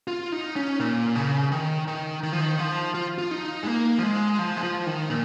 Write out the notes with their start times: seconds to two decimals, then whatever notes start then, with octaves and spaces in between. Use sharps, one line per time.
0.08 F4
0.32 D#4
0.56 C#4
0.80 A#2
1.16 C#3
1.52 D#3
1.88 D#3
2.23 D#3
2.32 F3
2.41 D#3
2.59 F3
2.95 F4
3.18 F4
3.31 D#4
3.63 G#3
3.67 A#3
3.99 F3
4.03 G#3
4.39 F3
4.57 G#3
4.63 F3
4.86 D#3
5.10 A#2